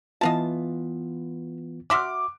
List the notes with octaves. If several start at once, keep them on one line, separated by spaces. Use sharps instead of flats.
E3 B3 F4 D#5 F5 A5
F#4 E5 C6 D6 F6